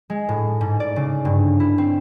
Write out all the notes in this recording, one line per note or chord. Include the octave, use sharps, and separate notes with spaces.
G#3
A2
G#2
D5
C#3
G2
E4
C4